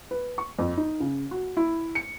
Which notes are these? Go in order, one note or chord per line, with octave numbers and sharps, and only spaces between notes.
B4
C#6
F2
D#4
C#3
F#4
E4
C#7